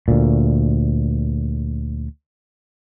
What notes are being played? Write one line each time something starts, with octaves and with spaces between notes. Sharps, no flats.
D2 A#2